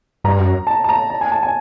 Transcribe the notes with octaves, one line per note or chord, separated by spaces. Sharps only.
G2 A#5
F#2
A5
A5
A#5
A5
G#5
A5
G#5